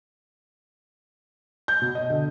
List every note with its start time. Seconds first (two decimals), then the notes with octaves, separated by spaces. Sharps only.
1.68 G6
1.82 B2
1.95 D#5
2.10 D3